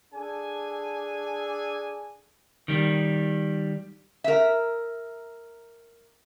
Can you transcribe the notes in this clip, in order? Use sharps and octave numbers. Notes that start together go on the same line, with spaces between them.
D4 G#4 A4 G#5
D#3 G3
A#4 E5